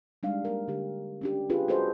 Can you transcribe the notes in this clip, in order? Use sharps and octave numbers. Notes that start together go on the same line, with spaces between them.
G3 G#3 D4 D#4 F5
A#3 A#4
D3 G4
C#4 D4 G4
C4 D4 F4 G4 G#4 B4
F#4 G#4 A4 B4 C5 D#5